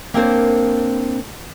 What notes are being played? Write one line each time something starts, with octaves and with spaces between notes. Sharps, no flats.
A#3 C4 D4 A#4 C5 C#5